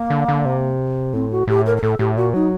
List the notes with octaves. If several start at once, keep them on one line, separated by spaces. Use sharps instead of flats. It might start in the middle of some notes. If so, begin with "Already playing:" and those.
Already playing: A#3
D3
D3
C3
A2 C4
F#4
A2 G4
A#4
A#4
A2 A4
A2 G4
A#2 F#4
F#3 D#4